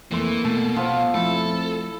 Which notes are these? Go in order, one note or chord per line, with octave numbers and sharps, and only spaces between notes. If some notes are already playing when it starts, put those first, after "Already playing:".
F2 E3 A3 A#3 C6
B2 A3 A4
F3 B3 F5
F2 F3 A3 E4 A4